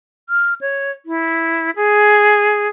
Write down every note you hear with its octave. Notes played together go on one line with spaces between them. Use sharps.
F6
C#5
E4
G#4